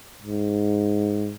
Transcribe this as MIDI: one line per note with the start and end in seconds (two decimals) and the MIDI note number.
0.23 1.34 44